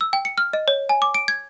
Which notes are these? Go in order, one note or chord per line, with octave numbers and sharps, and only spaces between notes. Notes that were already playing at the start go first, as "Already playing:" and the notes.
E6
G5
C#7
F6
D#5
C#5
G#5
D6
D7
G#6